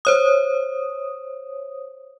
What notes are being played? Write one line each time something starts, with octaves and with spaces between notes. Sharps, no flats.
C5 C#5 D#6